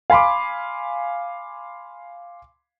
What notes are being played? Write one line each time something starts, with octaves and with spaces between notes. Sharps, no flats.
F5 G#5 B5 C6 D6